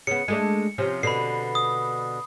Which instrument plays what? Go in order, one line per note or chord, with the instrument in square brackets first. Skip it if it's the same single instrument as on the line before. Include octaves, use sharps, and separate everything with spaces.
[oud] C#3 B3 [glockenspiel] C#7
[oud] G#3 A3 D4
C3 F3 C#4
[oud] B2 D3 [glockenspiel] B5 C7
[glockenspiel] D#6